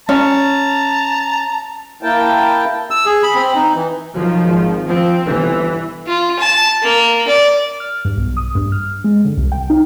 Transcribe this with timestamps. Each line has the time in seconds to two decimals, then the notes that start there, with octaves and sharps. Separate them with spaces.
0.09 C#4 A5 A#5
2.03 A#3 E4 A#4 G5 A5
2.91 E6
3.06 G#4
3.23 B5
3.35 C4
3.55 D#4
3.75 E3
4.14 D#3 F3 F#3
4.44 G#1
4.89 F3 C4
5.26 G1 E3
6.07 F4
6.39 A5
6.82 A#3
7.28 D5
7.80 F6
8.05 G2
8.17 B1
8.37 D#6
8.55 G2
8.72 F6
9.04 G#3
9.25 D3
9.37 C2
9.52 G5
9.70 D#4